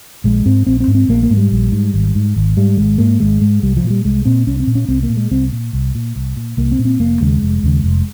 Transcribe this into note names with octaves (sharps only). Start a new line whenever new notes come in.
A#1 G#3
G#2 C4
A#1 C4
C4
G#2
C4
A#1 A#3
A#3
G#2
G3
A#1
G#2
G#1
G#2
G#1
G#2 G3
G#1 G#3
G#2 A#3
G#1 G#3
G#2 G#3
C2 G3
F3
A#2
G3
C2 G#3
A#2 C4
C2 C#4
C4
A#2
C#4
C2 C4
A#3
A#2
G#3
C2 C4
A#2
C2
A#2
C2
A#2
C2 A#3
C4
A#2
C4
F1 A#3
D#2 C#3 G#3
F1
D#2 C#3
F1